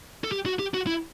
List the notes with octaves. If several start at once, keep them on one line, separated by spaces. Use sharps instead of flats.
A4
G4
F#4
G4
F#4
E4